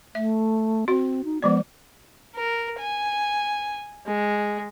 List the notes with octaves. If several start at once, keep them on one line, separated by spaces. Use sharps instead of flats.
A3 E5
C4 F#4
D#4
F3 G#3 B3 D5
A#4
G#5
G#3